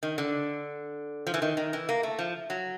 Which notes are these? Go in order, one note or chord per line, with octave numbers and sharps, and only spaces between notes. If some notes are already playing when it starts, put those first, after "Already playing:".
D#3
D3
F3
E3
D#3
D#3
E3
A#3
A3
F3
F#3